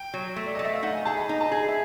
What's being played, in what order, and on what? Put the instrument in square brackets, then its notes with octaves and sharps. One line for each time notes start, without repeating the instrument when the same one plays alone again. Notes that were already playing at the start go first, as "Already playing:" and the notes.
Already playing: [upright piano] G5
[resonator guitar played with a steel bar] F#3
A3
[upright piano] D5
[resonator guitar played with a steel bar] A3 [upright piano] D#5
[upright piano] E5
F5
[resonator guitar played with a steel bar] D#4 [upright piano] F#5
[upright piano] G#5
[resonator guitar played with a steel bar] G#4 [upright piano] A5
[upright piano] B5
[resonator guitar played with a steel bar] D#4 [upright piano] A#5
[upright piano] A5
[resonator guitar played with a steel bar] G#4 [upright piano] G#5
[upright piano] E5